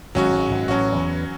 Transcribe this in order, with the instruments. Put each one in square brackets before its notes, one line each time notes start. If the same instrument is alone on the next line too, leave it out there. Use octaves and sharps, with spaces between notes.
[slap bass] G#1 G#2 [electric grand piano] F#3 C#4 F#4
[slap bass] G#1 G#2
G#1 G#2
[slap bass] A1 A2 [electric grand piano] F#3 C#4 F#4
[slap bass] E2 E3